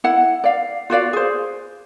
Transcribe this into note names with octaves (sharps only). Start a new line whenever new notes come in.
E4 F#5
D5 F5
F4 F#4 D5 F5
G#4 C5